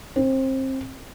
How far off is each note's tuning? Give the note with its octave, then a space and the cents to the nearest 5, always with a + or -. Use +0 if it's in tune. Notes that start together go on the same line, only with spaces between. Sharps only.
C4 +25